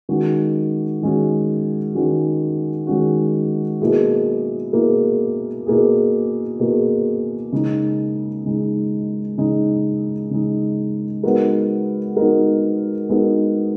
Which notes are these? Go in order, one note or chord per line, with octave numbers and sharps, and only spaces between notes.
D#3 G#3 C#4 F#4
D#3 G#3 C#4 F#4
D#3 G#3 C#4 F#4
D#3 G#3 C#4 F#4
B2 A#3 E4 G#4
B2 A#3 E4 G#4
B2 A#3 E4 G#4
B2 A#3 E4 G#4
C#3 G#3 D#4
C#3 G#3 D#4
C#3 G#3 D#4
C#3 G#3 D#4
G#3 B3 D#4 F#4 A#4
G#3 B3 D#4 F#4 A#4
G#3 B3 D#4 F#4 A#4